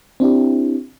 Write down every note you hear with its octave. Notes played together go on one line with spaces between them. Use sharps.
C4 D4 E4 G4